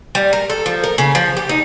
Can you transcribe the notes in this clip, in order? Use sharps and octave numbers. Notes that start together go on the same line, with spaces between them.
G3
A#4
A4
F3
A#4
C#3
F3
G4
D#4